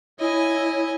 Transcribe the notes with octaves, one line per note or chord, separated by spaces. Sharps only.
E4 C#5 D#5 G#5